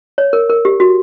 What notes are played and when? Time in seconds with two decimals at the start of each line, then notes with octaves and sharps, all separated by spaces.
0.18 C#5
0.33 A#4
0.50 A#4
0.65 G4
0.80 F#4